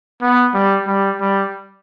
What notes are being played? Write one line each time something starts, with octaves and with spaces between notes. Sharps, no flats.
B3
G3
G3
G3